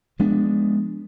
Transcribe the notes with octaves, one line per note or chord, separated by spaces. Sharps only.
F3 G#3 B3 D4